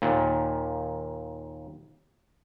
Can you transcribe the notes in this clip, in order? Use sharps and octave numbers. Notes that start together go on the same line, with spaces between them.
D#2 A#2